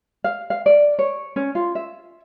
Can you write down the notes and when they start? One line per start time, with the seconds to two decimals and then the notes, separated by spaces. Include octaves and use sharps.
0.24 F5
0.50 F5
0.66 D5
0.99 C#5
1.36 C#4
1.55 F4
1.75 E5